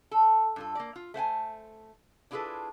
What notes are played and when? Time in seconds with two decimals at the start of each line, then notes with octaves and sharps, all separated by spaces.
0.11 A4
0.56 G2 F4 A4
0.75 A#3 D5
0.96 F4
1.14 A3 C5 F#5 G#5
2.31 D4 E4 F4 G#4 A4 B4